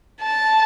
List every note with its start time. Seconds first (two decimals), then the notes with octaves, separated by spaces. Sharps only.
0.22 A5